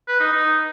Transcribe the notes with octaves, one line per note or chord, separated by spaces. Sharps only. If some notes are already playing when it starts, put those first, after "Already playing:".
B4
D#4
D#4